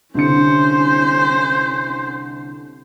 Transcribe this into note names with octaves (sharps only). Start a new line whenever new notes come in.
C2 D3 C#4 C5 C#7